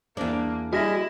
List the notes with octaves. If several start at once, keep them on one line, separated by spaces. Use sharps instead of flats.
E2 A#3 D4
G3 E4 F#4 G#4 D#5 A#6